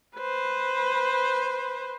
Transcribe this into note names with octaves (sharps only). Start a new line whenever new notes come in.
B4 C5